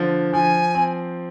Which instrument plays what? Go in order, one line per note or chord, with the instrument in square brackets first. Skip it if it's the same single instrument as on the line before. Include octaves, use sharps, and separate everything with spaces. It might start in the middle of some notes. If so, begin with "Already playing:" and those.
Already playing: [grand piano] D3 F3
[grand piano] F3 [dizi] G#5
[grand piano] C4